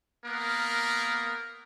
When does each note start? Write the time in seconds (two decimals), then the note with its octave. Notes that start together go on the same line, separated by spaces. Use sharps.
0.25 A#3 B3 A#4